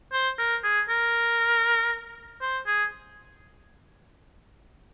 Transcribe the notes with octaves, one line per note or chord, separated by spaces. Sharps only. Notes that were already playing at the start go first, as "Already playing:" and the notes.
C5
A#4
G#4
A#4
C5
G#4